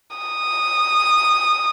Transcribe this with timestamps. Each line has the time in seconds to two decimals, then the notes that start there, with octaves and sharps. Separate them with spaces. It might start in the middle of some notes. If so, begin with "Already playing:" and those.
0.17 D#6